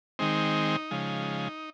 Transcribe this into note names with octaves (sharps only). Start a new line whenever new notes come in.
D#3 G#3 C4 D#4
C#3 F3 G#3